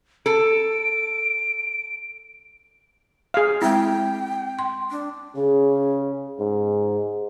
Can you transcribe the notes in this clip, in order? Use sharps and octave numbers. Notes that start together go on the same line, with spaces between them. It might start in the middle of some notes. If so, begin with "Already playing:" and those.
A4 D7
G#4 F5
G#3 C4 E4 G5
C6
D4
C#3 G#4
G#2 G#4